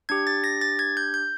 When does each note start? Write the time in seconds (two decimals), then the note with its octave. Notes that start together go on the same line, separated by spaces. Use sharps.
0.09 D4 G4 G#6
0.27 A6
0.44 A#6
0.61 A6
0.79 G#6
0.97 G6
1.14 G6